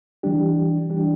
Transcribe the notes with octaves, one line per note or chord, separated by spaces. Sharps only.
E3 G3 D4 G4
E3 G3 D4 G4